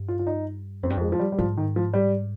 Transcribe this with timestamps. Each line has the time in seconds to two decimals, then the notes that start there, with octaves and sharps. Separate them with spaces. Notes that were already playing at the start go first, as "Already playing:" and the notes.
Already playing: G2
0.08 F4
0.19 F4
0.27 D#4
0.83 F2 C4
0.90 G2
0.97 F2 G#3
1.12 F3
1.19 G3
1.32 G3
1.38 G#2 F3
1.57 D#3
1.76 F3
1.93 G3